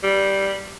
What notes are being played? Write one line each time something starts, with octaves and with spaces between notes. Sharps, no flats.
G3